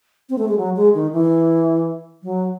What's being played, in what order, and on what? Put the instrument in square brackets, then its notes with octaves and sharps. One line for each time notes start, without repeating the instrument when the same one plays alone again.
[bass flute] C4
A3
G#3
F#3
G#3
D#3
E3
F#3